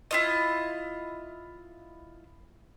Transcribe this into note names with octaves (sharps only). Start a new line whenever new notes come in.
E4 F4 D#5